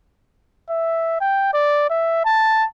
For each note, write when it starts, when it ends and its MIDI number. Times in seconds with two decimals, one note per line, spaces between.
0.70 1.19 76
1.21 1.53 79
1.53 1.85 74
1.90 2.22 76
2.25 2.65 81